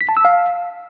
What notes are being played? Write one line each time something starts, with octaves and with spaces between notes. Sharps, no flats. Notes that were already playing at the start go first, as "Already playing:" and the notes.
B6
A5
E6
F5